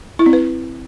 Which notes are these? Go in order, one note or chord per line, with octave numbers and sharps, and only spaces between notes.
E4
C4
B4